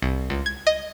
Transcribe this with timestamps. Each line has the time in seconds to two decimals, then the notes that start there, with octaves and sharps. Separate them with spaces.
0.02 C2
0.30 C#2
0.46 G#6
0.67 D#5